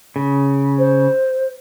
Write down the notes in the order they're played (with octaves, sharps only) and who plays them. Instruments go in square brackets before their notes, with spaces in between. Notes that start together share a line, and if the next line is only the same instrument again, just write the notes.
[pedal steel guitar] C#3
[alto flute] C5